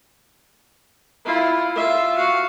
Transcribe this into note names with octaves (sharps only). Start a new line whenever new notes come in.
E4 F4
F4 E5
F#4 F5